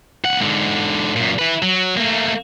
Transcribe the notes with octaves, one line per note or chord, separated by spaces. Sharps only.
C#2 F#5
G#2 D3
F#2 A#2
E4 B4
F#3
A3 A#3